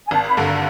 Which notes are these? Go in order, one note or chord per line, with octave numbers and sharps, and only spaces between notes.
G#5
G#1 A5
B5
G2 D3
A#5